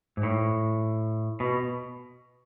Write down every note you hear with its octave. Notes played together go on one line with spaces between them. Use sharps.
G#2
A2
B2